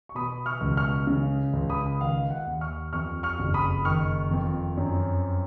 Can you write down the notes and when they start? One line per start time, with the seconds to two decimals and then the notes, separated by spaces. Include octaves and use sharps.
0.09 C#6
0.15 B2 B5 D#6
0.46 C#6 F6
0.61 C#2
0.77 C#6 F6
1.07 C#3
1.54 C#2
1.70 B5 D#6
2.00 D#3 F5
2.30 F#5
2.47 D#2
2.61 C#6 F6
2.93 F2 C#6 F6
3.23 C#6 F6
3.39 F#1
3.54 B5 D#6
3.85 D#3 C#6 F6
4.31 F2
4.77 F#2